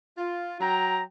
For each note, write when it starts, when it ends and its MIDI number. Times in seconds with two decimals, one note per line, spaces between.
0.18 0.56 65
0.60 1.01 54
0.60 1.01 79
0.60 1.01 82